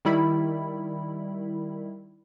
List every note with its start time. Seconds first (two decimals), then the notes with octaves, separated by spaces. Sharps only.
0.05 D#3 G3 E4 B5